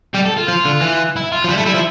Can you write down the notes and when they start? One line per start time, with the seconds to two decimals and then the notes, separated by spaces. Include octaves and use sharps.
0.14 G3 G4
0.25 A4
0.37 F4
0.48 F3
0.65 D3
0.81 E3
1.16 E4
1.32 F4
1.44 F3
1.49 G3 E4
1.57 A3
1.66 G3 E4
1.74 F3